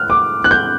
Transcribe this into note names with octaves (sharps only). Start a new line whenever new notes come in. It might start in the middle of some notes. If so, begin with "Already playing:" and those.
Already playing: F6 F#6
D6
F#6
G6